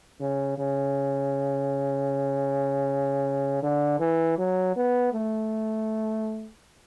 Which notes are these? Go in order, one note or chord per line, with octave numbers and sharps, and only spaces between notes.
C#3
C#3
D3
E3
F#3
B3
A3